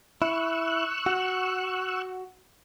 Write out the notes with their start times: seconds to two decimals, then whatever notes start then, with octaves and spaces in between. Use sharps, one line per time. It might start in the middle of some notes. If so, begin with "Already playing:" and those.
0.22 E4 C#6 E6 F#6
1.06 F#4